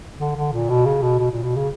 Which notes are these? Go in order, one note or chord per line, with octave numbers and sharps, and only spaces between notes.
D3
D3
A#2
B2
C#3
B2
B2
A#2
B2
C#3